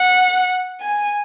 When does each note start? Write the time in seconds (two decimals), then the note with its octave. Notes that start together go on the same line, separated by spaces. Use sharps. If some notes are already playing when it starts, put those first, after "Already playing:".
Already playing: F#5
0.80 G#5